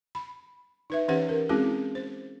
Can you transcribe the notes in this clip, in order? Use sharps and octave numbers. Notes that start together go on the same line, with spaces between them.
B5
D#4 B4 E5
E3 C#4 G4 B4 C5 F#5
A#4
G#3 C4 C#4 E4 F#4 G#4
C5